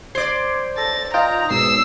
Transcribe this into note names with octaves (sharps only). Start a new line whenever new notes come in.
C5 D5 C6 D6 G#6
A4 A6 A#6
D#4 F4 G5 A#5 D#6
G#2 B2 E6 C7